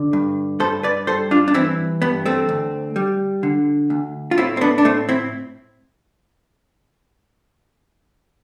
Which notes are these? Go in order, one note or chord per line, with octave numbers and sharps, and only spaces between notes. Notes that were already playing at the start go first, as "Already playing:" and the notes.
Already playing: D3
G2
G2 A4 C5
B4 D5
G3 A4 C5
D4 F4
D4
E3 C4 E4
G2 B3
A3 C4
D2
G3
D3
D2
F4
A2 C4 E4
C4
B3 D4
D4
A2 A3 C4
C4 E4